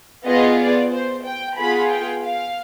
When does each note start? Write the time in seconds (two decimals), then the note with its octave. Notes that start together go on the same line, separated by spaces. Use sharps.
0.26 B3 F4 G#4 D#5
0.59 D5
0.91 C5
1.26 G5
1.58 B3 F4 G#4 B5
1.91 G5
2.24 F5